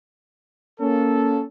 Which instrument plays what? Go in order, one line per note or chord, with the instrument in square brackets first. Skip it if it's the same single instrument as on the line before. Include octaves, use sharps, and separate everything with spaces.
[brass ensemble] A#3 C#4 A4